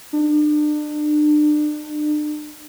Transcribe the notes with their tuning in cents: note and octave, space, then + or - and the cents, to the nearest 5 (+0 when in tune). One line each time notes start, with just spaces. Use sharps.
D4 +35